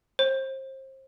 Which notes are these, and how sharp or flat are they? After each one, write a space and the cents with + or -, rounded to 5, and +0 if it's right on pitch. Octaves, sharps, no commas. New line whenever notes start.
C5 +30